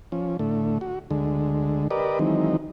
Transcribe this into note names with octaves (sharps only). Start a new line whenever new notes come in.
F3 C#4
A2 D3 A3
F#4
D2 D3 G#3
G4 A#4 B4 D5 D#5
D#3 E3 F#3 G#3 C4 D#4